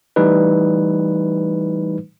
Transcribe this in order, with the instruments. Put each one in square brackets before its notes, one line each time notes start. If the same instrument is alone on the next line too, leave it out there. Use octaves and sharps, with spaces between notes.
[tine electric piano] E3 G3 A3 D#4 B4